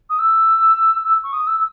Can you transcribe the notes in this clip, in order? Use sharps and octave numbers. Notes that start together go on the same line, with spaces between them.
D#6
E6
E6
C#6
D#6
E6